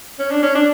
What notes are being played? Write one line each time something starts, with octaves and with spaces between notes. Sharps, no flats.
C#4
D4
C#4
D4